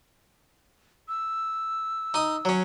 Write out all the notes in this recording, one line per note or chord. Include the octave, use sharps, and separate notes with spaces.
E6
D#4 D#6
F#3 C#4